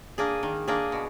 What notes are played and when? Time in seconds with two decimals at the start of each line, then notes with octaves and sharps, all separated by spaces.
0.18 A#3 D4 G#4
0.43 D#3
0.68 A#3 D4 G#4
0.92 B2